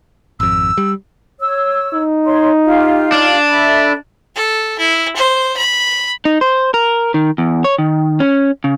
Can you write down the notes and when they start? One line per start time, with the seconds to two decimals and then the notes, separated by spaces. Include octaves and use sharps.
0.40 G#1 F2 E6
0.78 G3
1.40 C#5 E6
1.94 D#4
2.26 C#5 C6
2.65 F4 G4 F5
3.12 D4
3.49 A4 E5 B5
4.35 A4
4.79 E4
5.16 C5
5.57 B5
6.25 D#4
6.41 C5
6.74 A#4
7.14 D#3
7.38 E2
7.64 C#5
7.79 D#3
8.20 C#4
8.64 C#3